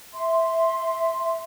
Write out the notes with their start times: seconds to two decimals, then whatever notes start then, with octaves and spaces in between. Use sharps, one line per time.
0.14 E5 C6